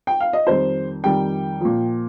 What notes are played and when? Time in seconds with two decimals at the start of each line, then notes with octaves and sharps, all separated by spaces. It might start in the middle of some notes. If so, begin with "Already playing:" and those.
0.07 G5
0.21 F5
0.33 D#5
0.47 F2 D#3 G3 C5
1.04 F2 D#3 G3 G5
1.61 A#2 F3